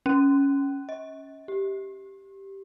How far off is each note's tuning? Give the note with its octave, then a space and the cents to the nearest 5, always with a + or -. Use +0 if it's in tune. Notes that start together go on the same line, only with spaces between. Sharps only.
C#4 +0
D#5 +45
G4 -5